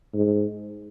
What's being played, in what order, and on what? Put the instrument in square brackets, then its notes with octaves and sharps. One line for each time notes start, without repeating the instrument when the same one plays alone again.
[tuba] G#2